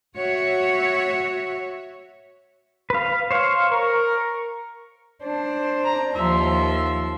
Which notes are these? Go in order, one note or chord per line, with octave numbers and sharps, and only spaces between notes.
F#4 C#5 E5
B4 F5
C5 C#5 F5
A#4 C#6
D4 C5
A#5
D#2 F3 E5 C6